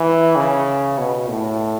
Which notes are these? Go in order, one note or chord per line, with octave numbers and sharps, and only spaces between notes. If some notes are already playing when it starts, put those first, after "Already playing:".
Already playing: E3
C#3
B2
A2